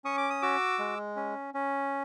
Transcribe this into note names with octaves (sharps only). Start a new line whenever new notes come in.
C#4 C#6 D#6
D6
D#6
F#4 D6 E6
G#3
C#4
C#4